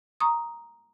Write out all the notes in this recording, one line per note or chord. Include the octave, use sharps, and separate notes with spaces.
A#5 C#6 D#6